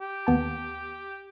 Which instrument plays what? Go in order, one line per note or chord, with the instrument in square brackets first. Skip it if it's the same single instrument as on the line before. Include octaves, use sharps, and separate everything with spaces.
[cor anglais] G4
[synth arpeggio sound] D#2 B3 A5